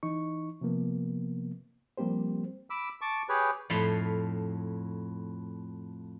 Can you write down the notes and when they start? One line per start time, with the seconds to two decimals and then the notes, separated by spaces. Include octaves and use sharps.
0.03 E3 D#4 C#6
0.61 C3 F3 A#3 B3
1.97 F3 G3 A#3 C4 G4 C5
2.70 B5 D6 E6
3.01 A5 C#6 D6
3.29 G4 G#4 B4 C#5
3.70 F2 A2 A3 F5 B5 C6